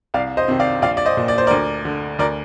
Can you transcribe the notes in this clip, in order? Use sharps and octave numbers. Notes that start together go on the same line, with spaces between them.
C2 D5 F5
C5 D#5
C3 D#3
D5 F5
A#1 D5 F5
D5
C5 D#5
A#2
D5
C5
D2 A#4 D5
D3
D2 A#4 D5